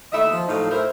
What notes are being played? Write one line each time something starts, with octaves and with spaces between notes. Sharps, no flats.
D#2 A3 D#5 E5
F3
A2 F3 F#3 D#4 F5
A2 E4 A#4 C5